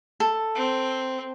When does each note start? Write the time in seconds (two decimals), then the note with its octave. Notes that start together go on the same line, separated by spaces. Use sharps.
0.20 A4
0.55 C4